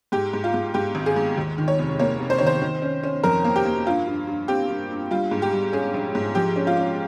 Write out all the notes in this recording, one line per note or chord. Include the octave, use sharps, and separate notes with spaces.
G#2 G4
G#2
F4
G#2
G#2 G4
G#1
G#4
G#2
D#2
D#3
C#5
F1
A#3 C#5
F1
C5
D#3 C#5
C5
D#3
C#4
C#4
F2 A#4
A#3
G4
A#3
G2 F4
G2
G2
C4 G4
G2
G2
G3 F4
G#2
G4
G3
C#4 G#4
A#1
G#2
F3 G4
C#4
F4
C#4